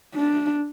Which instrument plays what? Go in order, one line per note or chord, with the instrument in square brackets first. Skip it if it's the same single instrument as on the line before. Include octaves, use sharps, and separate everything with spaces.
[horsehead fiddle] D4